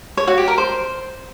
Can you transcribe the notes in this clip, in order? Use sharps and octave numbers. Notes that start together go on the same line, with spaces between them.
C#5
F#4
G4
A#4
C5